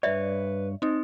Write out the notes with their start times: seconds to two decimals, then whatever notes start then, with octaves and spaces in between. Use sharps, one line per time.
0.03 G2 B4 C#5 D5 E5
0.82 C4 D#4